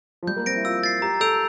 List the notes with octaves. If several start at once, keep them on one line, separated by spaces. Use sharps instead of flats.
F3
G3 G6
A#3
C4 A#6 D7
E4
F4 E6
A6 C7
G4 A#5
A4 E6 G6 D7 F7